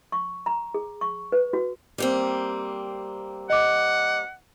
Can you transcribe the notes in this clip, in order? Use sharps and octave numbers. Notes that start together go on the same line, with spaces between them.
C#6
A#5
G#4
C#6
B4
F#4
G3 A#3 C4
D#5 F#5 D6